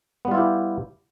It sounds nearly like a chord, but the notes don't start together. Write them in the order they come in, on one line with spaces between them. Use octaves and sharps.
B3 G3 F4 E4 G4